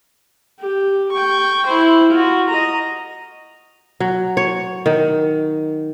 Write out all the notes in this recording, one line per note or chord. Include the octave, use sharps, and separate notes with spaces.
G4
G5 C#6
E4 C5
F4 F#4
D#5 A#5
F#3
C#5
D#3